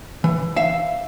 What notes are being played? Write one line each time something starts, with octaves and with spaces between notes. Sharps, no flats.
E3
E5 F5